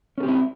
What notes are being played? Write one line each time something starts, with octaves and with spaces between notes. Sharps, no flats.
C4 C#4 E4 G4 A4